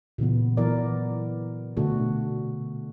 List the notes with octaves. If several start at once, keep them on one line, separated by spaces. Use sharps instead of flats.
A#2 C#3 E3 B3
E3 F#3 B3 A#4 D5
B2 D3 A3 D4 F#4 A4